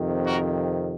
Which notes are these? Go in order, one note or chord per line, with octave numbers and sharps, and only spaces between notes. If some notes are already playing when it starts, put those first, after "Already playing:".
Already playing: F2 C3 D#3
F#4 A#4